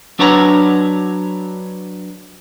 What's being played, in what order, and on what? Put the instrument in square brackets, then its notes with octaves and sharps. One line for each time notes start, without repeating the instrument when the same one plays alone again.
[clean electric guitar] F#3 D4 B4 C#5 F#5 A#5